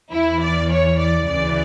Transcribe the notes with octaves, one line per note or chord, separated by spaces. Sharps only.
E2 E3 E4
D5
C#5
D5
D2 C#3 E3 D5